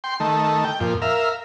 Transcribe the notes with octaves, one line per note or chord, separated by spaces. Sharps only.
G5 C6
D#3 A3
G5
F2 A#2
A#4 E5 F5